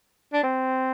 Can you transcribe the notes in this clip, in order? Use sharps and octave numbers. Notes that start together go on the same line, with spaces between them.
D4
C4